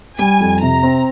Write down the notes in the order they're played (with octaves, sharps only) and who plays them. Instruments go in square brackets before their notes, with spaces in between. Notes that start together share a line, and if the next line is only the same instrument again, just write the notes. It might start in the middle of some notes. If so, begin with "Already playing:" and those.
[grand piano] G3 [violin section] G#5
[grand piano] F2
[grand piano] C3 [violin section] A#5
[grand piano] C4